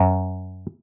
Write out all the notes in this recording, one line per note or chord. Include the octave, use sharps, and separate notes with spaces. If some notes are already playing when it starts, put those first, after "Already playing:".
Already playing: F#2